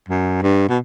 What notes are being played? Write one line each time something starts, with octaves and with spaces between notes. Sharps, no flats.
F#2
G2
B2